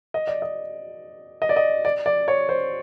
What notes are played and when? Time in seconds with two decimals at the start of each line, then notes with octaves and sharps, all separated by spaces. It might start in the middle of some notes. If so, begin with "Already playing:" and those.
0.14 D#5
0.27 D5
0.42 D#5
1.42 D#5
1.49 D5
1.56 D#5
1.85 D5
2.06 D5
2.28 C#5
2.49 C5